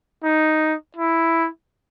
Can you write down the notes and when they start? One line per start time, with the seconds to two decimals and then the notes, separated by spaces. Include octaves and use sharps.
0.24 D#4
0.97 E4